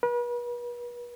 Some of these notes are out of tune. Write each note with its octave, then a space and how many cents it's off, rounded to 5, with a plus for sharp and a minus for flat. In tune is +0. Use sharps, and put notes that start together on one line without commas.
B4 -40